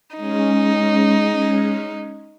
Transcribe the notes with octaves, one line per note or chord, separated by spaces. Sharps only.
G#3 C#4 D#4